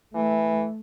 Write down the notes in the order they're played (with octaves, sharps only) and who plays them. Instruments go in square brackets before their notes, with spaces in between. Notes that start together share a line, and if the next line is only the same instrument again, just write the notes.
[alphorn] E3 [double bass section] A3